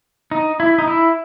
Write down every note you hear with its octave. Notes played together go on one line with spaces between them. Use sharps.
D#4
E4
D#4
E4